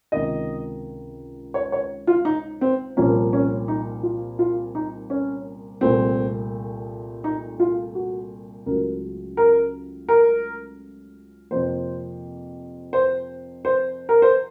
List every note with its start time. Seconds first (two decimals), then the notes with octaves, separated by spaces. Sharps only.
0.12 C#2 C3 D#3 D#5
1.54 C#5
1.72 C#5
2.07 F4
2.25 D#4
2.61 C4
2.97 C2 A#2 F3 A#3 C#4
3.33 C#4
3.68 D#4
4.03 F4
4.39 F4
4.75 D#4
5.10 C#4
5.81 C2 A#2 A3 C4
7.24 D#4
7.60 F4
7.95 F#4
8.66 C#2 C#3 F#3 A3 A#4
9.37 A#4
10.09 A#4
11.51 F2 C3 F3 A#3 C5
12.93 C5
13.65 C5
14.09 A#4
14.22 C5